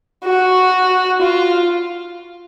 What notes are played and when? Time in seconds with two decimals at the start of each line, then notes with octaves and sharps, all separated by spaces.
0.24 F#4
1.21 F4